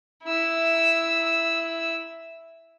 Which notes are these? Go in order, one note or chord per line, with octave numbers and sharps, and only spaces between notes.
E4 E6